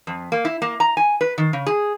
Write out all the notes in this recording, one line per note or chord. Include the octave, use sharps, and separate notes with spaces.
F2
A#3
E4
A#3
A#5
G#5
B4
D#3
C#3
G#4